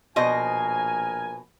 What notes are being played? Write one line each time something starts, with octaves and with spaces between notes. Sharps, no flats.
A#1 B2 A#4 C5 D#5 G#5